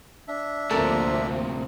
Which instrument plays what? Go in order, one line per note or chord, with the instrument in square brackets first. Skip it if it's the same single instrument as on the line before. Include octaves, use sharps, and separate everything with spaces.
[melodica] D4 E5
[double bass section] D2 F3 A#3 [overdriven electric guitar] A2 C3 [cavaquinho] A4 A#4